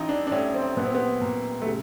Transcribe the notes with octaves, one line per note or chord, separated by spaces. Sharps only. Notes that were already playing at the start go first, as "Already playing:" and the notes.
Already playing: A1 D#4
D4
D4
A2 C#4
C4
A#2 B3
C4
B3
A#2 A#3
A3
C#3